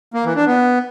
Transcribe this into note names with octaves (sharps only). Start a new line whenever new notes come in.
A#3
E3
D4
B3